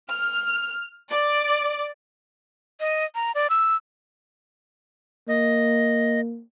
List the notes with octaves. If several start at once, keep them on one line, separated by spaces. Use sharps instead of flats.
F6
D5
D#5
A#5
D5
E6
A#3 D#5